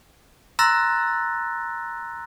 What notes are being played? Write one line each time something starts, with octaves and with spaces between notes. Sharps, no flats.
A#5 C6 E6 F#6 A6 A#6